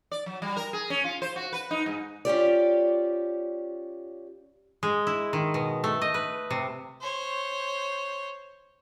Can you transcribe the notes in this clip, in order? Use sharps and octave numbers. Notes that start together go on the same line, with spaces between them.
D5
F#3
G3
A#4
G#4
C#4
F4
C5
F#4
B4
D#4
G#2
C#4 F4 G4 D5
G#3
E4
D#3
B2
A3
D#5
B4
C3
C5 C#5